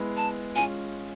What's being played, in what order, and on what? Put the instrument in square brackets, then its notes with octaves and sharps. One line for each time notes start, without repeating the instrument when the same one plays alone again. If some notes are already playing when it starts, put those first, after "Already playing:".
Already playing: [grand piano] G#3 B3 E4
[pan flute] A5
[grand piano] G#3 C#4 F4 [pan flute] G#5